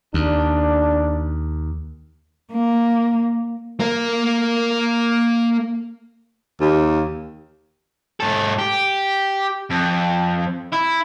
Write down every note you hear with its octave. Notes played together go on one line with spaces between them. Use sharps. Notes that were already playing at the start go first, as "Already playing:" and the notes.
D#2 D4
A#3
A#3 A#4
D#2
G#2 A4
G4
F2
E4